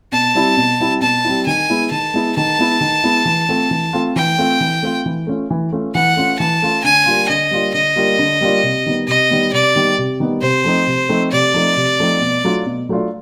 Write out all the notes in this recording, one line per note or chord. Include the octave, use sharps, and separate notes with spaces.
B2 A5
G3 C4 E4
B2
G3 C4 E4
B2 A5
G3 C4 E4
D#3 G#5
G#3 B3 E4
D#3 A5
G#3 B3 E4
D#3 A5
G#3 B3 E4
D#3
G#3 B3 E4
E3
A3 C4 F4
E3
A3 C4 F4
E3 G5
A3 C4 F4
E3
A3 C4 F4
E3
A3 C#4 F4
E3
A3 C#4 F4
E3 F#5
A3 C#4 F4
E3 A5
A3 C#4 F4
D3 G#5
G3 A#3 D4 F4
D3 D#5
G3 A#3 D4 F4
D3 D#5
G3 A#3 D4 F4
D3
G3 A#3 D4 F4
C3
D#3 G3 B3
C3 D#5
D#3 G3 B3
C3 D5
D#3 G3 B3
C3
D#3 G3 B3
C3 C5
F3 A3 C4 D#4
C3
F3 A3 C4 D#4
C3 D5
F3 A3 C4 D#4
C3
F3 A3 C4 D#4
B2
F#3 A3 D4 F4
B2
F#3 A3 D4 F4